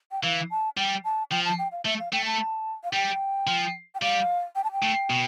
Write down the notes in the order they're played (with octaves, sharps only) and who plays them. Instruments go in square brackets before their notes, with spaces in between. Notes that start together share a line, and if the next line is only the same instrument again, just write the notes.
[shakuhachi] G5
[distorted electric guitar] E3 [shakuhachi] F5
[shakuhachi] A5
[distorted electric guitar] G3 [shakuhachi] G5
[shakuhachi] A5
[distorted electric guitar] F3 [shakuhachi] G5
[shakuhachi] A5
G5
F5
[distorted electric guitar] A3 [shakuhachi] E5
[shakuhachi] F5
[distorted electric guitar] A3 [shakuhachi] G5
[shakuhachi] A5
F5
[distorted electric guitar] G3 [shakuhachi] G5
[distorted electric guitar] F3
[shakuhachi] G5
[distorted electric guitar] G3 [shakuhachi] F5
[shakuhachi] G5
A5
G5
[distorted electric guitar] A2
B2